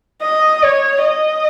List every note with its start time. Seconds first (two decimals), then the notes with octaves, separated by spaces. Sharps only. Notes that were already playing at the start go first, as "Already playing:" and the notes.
0.22 D#5
0.63 C#5
1.05 D#5